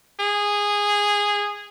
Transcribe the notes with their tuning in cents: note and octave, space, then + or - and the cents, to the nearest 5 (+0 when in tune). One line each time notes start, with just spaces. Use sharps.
G#4 -15